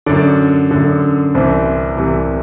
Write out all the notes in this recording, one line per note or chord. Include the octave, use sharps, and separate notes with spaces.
F#2 D3 D5
F#2 D3
C2 C3 E3 C5
C2 C3 E3